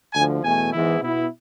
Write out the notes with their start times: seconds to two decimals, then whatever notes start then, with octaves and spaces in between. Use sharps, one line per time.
0.13 D2 D3 F3 G#5
0.43 E2 B2 A3 G#5
0.72 G#2 E3 G#3 B3 E4
1.00 B2 B3 E4